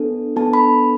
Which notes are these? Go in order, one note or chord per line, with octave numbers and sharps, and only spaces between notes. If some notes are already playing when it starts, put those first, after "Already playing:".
Already playing: B3 D4 A4
B3 D4 A4 A5
B5